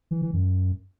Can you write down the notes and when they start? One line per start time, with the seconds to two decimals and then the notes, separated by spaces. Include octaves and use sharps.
0.11 E3
0.22 E3
0.33 F#2